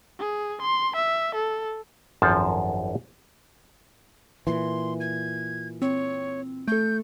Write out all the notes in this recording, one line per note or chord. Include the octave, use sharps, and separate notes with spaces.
G#4
C6
E5
A4
G#1 F#2 F3 A4 C5 A5
A#2 E3 C6
G#6
C4 C#5
A3 A4 G6